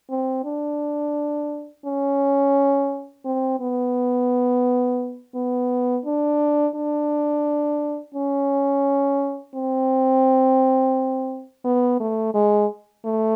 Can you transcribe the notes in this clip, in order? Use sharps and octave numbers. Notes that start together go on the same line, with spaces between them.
C4
D4
C#4
C4
B3
B3
D4
D4
C#4
C4
B3
A3
G#3
A3